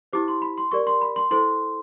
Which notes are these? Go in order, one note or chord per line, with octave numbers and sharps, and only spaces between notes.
E4 G4 C5 D6
C6
B5
C6
G4 A#4 D5 C#6
C6
B5
C6
E4 A4 C5 C6